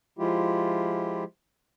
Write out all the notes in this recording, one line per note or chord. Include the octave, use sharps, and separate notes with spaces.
F3 G#3 E4 F4 G4